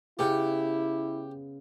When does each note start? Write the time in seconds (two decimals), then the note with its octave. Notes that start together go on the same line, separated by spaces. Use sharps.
0.19 C#3 B3 E4 G4